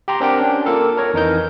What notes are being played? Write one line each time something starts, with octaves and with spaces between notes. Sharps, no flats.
G4 G5 A#5 C6
C4 D4 G4 A#4 F#5 G5
C#4 D4
A#3 F4 A4 A#4
A#4 C#5 A#5
F2 E3 D#4 A#4 D#5 G6